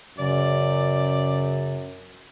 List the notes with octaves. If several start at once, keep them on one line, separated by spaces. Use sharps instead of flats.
F#2 C#3 D5